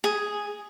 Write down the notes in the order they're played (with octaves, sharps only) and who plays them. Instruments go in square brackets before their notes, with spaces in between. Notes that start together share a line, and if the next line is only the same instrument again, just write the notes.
[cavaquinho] G#4